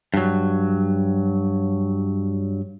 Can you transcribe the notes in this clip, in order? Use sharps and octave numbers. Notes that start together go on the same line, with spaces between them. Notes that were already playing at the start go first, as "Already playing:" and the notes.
G2 F#3